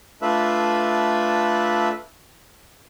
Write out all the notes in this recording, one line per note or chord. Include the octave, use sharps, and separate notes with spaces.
A3 D4 F4 B4 E5